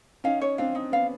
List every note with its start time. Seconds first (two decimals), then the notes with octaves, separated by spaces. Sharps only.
0.24 C#4 D#4 F5
0.41 C#5
0.58 C4 D4 F5
0.75 D#4
0.92 B3 C#4 F5